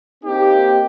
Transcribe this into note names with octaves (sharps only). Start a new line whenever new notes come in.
A#3 C4 D#4 G4